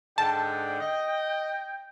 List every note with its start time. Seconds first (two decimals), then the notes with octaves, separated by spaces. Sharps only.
0.18 G#2 D3 G5 A5
0.81 D#5